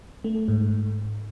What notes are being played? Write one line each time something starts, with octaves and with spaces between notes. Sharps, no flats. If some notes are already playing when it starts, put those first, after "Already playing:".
A3
G#2